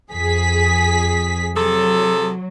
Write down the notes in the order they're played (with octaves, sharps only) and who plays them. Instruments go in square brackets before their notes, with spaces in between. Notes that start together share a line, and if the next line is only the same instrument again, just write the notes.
[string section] F2 G#4 B6
[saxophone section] C3 G#4 A4 [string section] F#3